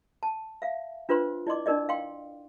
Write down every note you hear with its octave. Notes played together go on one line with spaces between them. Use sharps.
A5
E5 F5
D4 F4 B4 C5 C6
E4 D5 D#5 C6 D6
D4 D#4 A#4 D5 D#5
F5 G5 C6